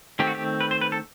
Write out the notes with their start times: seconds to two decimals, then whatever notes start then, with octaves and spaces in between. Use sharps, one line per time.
0.19 D#3 A3 C4 G4
0.27 F#4
0.35 G4
0.61 B4
0.71 C5
0.81 B4
0.92 A4